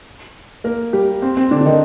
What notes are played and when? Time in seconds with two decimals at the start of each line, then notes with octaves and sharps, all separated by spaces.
0.64 A#3 A#4
0.93 G3 G4
1.22 C4
1.37 C4
1.51 D3 D4
1.61 D4
1.66 D#3 D#4